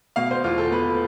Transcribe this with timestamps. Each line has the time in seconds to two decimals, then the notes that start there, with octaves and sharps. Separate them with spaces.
0.16 B2 F5
0.31 C5
0.44 E2 F4
0.58 A4
0.71 B2 B4